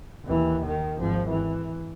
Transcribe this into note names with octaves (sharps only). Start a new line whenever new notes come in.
D#2 E3
D#3
G#1 F3
E3